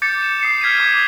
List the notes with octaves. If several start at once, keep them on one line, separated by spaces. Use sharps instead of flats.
D6 G6 A6 C#7
E7
D#6 C7 C#7
F6 G#6 B6 C#7 D#7
D6 D#6 G#6
G#6